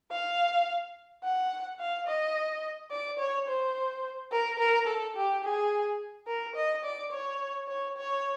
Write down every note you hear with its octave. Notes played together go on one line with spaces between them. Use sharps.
F5
F#5
F5
D#5
D5
C#5
C5
A#4
A#4
A4
G4
G#4
A#4
D#5
D5
C#5
C#5
C#5